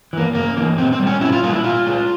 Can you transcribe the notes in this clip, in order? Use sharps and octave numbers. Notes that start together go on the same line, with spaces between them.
E3 A#3
C#3 A#3
E3 A#3
A#2 C4
C4
G3 A#3
C#4
A#2 E4
F4
G3 A#3 F4
E4
A#2 F4
G#3